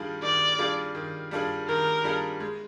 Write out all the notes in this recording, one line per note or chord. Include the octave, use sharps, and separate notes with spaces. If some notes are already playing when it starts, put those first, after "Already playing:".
Already playing: D#3 G3 D4 F4 G#4
D#3 D5
G3 D4 F4 G#4
D#3
G3 D4 F4 G#4
D#3 A#4
G3 D4 F4 G#4
G#3